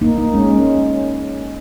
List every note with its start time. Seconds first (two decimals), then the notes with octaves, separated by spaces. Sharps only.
0.01 A#3 D#4
0.18 A#3 D#4
0.34 G#3 C#4
0.50 G#3 C#4